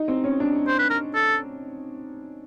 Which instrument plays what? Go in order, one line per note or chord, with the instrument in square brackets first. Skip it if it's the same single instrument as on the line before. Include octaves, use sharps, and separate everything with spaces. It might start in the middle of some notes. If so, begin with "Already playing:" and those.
Already playing: [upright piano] D#4
C4
C#4
D4
[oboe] C5
B4
A#4
A4